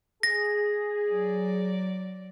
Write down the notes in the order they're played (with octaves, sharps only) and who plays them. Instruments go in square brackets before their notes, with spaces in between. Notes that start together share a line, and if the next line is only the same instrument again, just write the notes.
[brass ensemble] G#4 [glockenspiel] A#6
[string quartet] F#3 D5